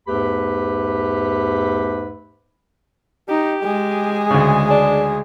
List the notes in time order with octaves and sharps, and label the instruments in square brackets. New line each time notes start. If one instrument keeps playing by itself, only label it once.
[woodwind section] E2 G#2 A3 G4 B4 B5
[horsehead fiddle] D#4 [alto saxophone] G4
[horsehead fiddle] G#3 G#4
[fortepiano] D2 C#3
[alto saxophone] D4